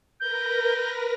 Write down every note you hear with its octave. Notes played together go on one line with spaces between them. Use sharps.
A#4 B4 G6 A#6